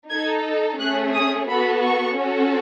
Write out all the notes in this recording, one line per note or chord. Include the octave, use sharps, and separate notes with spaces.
D#4 A4 G#6
A3 C#4 G#4 F#6
D#6
B3 F#4 A4 B5
C#6
C#4 F#4 A4